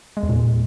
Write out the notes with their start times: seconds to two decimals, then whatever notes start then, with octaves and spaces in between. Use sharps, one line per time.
0.17 G#3
0.23 E2
0.29 A#2
0.35 E2